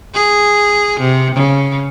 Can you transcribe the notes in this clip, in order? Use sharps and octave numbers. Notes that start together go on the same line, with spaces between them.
G#4
C3
C#3